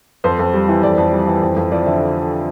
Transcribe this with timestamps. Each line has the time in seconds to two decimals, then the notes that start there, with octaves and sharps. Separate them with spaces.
0.24 F2 C5
0.39 F2
0.54 G3
0.68 E3
0.83 F2 D5
0.98 F2
1.12 G3
1.27 E3
1.42 F2
1.56 F2
1.71 F3 D5
1.86 D3 E5